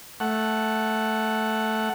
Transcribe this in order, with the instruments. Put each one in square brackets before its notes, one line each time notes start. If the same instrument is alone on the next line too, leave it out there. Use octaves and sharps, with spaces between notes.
[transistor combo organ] A3 F#5